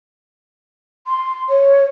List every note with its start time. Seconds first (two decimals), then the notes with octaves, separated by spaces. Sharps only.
1.07 C6
1.49 C#5